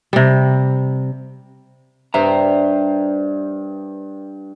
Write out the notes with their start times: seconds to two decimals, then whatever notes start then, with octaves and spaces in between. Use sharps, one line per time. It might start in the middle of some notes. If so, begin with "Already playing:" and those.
0.13 C3 G3
2.14 G2 C5 E5 A#5